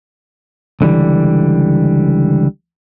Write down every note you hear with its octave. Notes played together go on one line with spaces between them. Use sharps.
C#2 D3 E3 G3